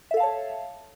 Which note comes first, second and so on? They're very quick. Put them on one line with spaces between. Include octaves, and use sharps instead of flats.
E5 A4 F5 A5 C#5